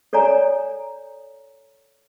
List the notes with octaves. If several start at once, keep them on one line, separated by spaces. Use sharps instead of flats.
A4 C#5 D5 G#5 A#5